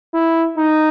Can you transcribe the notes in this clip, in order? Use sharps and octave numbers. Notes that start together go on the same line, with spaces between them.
E4
D#4